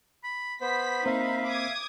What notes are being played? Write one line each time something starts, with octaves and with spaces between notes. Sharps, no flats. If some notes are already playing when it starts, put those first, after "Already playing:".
B5
B3 C5 B5 B6
A#3 C4 D#4 C5 E5 F5
D6 D#6 G#6